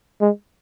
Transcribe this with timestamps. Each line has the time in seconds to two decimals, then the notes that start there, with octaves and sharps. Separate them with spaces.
0.21 G#3